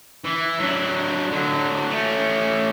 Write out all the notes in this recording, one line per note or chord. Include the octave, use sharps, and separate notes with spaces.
E3
F#3 D4
D3 F#3
A3 C#4